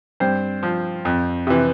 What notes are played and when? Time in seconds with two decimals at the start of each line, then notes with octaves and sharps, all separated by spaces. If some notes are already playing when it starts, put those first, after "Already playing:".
0.20 G2 C4 C5
0.63 F3
1.05 F2
1.47 C3 E3